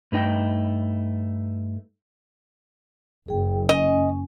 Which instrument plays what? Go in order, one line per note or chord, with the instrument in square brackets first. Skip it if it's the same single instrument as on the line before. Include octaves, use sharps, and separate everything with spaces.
[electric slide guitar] G2 A3 D#4 G5
[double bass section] F#1 [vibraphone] G#4 G5
[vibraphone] C#4 G#5 [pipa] D#5